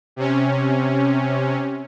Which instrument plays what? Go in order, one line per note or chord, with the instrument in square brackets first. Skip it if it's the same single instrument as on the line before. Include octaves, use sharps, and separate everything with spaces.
[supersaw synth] C3 C#4